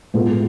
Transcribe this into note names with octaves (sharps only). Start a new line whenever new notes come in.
A2 G#3 B3 F4 A4